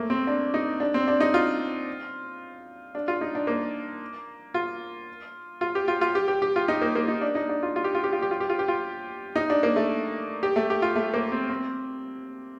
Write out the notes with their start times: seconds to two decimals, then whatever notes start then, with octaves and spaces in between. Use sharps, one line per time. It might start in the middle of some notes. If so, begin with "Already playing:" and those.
Already playing: A3 A#3
0.10 C4
0.27 D4
0.54 D#4
0.80 D4
0.94 C4
1.08 D4
1.20 D#4
1.34 F4
2.95 D4
3.08 F4
3.21 D#4
3.35 D4
3.47 A#3
4.54 F4
5.61 F4
5.75 G4
5.88 F4
6.01 F4
6.15 G4
6.28 G4
6.42 G4
6.56 F4
6.68 D#4
6.82 A#3
6.96 A#3
7.08 D#4
7.21 D4
7.35 D#4
7.49 D4
7.63 F4
7.76 F4
7.84 G4
7.95 F4
8.04 G4
8.13 F4
8.22 G4
8.31 F4
8.40 G4
8.49 F4
8.59 G4
8.68 F4
9.36 D#4
9.50 D4
9.63 A#3
9.76 A3
10.43 G4
10.56 A3
10.70 G4
10.82 F4
10.96 A3
11.14 A#3
11.32 C4
11.50 C4